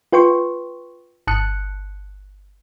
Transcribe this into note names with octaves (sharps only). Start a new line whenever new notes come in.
F4 B4 G5 C6 C#6
G1 A5 D#6 F#6 C#7